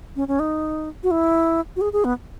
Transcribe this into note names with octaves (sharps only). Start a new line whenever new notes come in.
C#4
C#4
D#4
F#4
E4
F#4
G#4
G#4
B3